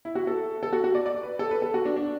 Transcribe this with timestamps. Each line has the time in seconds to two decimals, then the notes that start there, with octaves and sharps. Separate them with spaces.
0.05 E4
0.15 F#4
0.27 A4
0.63 A4
0.73 F#4
0.84 F#4
0.95 D5
1.06 D5
1.23 B4
1.39 A4
1.51 B4
1.62 A4
1.74 F#4
1.85 D4
1.96 D4